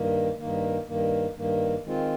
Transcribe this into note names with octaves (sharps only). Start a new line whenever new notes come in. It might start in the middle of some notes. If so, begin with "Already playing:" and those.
Already playing: G2 D#3 A#3
G2 D#3 A#3
G2 D#3 A#3
G2 D#3 A#3
D#3 G#3 C4 F4